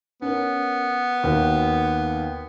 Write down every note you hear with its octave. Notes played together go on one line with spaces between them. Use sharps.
B3 C#4 A#4
D#2 F#4 A#4